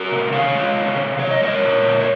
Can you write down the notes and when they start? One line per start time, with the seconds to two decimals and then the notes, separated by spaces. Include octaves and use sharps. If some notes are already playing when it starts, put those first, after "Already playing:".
Already playing: F#4 A#4
0.12 C3
0.33 D#3 C#5 F5
0.55 G#3
0.76 C3
0.98 C3
1.19 F3 C#5
1.31 D#5
1.40 G#3 A#4 C#5
1.62 A#2
1.84 A#2
2.00 C#5